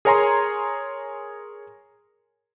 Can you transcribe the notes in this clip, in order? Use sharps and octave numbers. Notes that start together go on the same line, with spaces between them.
G#4 A#4 C#5 G#5 A#5 C6